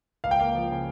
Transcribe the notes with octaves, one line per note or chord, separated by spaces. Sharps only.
C#2 F5
G5
A#3 F5
F3
C#3